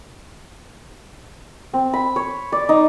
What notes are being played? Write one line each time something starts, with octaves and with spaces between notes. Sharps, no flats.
C4
B5
C#5
D5
D#4